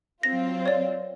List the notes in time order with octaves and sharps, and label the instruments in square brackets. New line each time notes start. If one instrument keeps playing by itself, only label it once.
[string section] F#3 C4 F4 [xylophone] A#6
[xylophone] C#5 D5